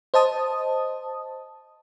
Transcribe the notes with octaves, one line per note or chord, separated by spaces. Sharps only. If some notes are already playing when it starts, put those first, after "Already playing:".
C5 D#5 A5 D#6